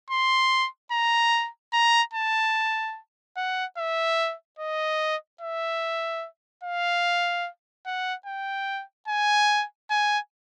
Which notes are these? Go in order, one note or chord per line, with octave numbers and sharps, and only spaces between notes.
C6
A#5
A#5
A5
F#5
E5
D#5
E5
F5
F#5
G5
G#5
G#5